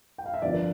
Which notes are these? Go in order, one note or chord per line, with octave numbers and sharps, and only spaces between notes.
G5
F5
E5
G1 F2 D3 F3 D5
A#4